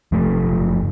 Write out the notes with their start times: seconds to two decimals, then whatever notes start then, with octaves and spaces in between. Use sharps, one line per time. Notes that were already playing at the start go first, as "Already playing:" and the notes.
0.12 F#1 F3 A3